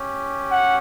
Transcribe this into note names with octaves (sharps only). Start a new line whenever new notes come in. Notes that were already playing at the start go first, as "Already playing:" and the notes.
Already playing: C#4 G4
F#5